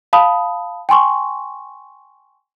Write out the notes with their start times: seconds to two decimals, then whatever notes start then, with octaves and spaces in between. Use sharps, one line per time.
0.13 F5 A5 B5 D#6
0.89 G5 G#5 C6 C#6